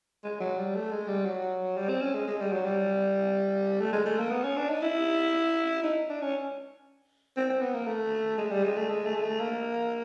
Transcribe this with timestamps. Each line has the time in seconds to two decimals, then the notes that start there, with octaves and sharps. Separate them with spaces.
0.24 G#3
0.40 F#3
0.58 G3
0.75 A3
0.91 G#3
1.08 G3
1.25 F#3
1.77 G3
1.89 C4
2.01 C#4
2.14 G#3
2.27 G#3
2.40 G3
2.52 F#3
2.65 G3
3.80 A3
3.93 G#3
4.05 A3
4.19 A#3
4.30 B3
4.43 C#4
4.56 D4
4.69 D#4
4.82 E4
5.83 D#4
6.09 D4
6.21 C#4
7.36 C4
7.49 C4
7.61 B3
7.74 A#3
7.87 A3
8.38 G#3
8.50 G3
8.64 G#3
8.76 A3
8.89 G#3
9.05 A3
9.15 G#3
9.23 A3
9.40 A#3